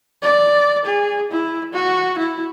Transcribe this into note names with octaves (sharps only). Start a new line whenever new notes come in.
D5
G#4
E4
F#4
E4